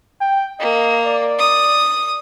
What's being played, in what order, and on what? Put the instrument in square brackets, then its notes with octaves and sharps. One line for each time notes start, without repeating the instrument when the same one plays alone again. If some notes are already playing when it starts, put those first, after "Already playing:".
[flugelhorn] G5
[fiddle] A#3 [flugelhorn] D#5
[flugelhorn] D5
[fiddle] D#6